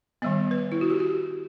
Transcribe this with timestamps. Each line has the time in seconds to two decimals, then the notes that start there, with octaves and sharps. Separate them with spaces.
0.22 D#3 G3 B3 D#5
0.51 B4
0.72 E4
0.81 F#4
0.90 G4
1.00 F#4